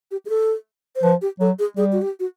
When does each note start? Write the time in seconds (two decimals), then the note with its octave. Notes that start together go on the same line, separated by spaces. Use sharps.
0.11 G4
0.26 G#4
0.30 A4
0.96 C5
1.03 F3 B4
1.22 G4
1.40 F#3 A4
1.59 G#4
1.77 G3 G#4
1.92 F#4
2.02 G4
2.20 F#4